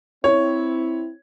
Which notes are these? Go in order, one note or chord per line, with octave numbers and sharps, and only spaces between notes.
C4 E4 C#5